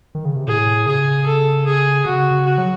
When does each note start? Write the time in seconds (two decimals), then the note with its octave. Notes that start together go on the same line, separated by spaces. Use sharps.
0.15 D#3
0.25 C#3
0.36 C3
0.47 A2 G#4
0.86 C#3 G#4
1.26 A4
1.66 G#4
2.05 C#3 F#4
2.31 C#3
2.45 F#4
2.58 F#3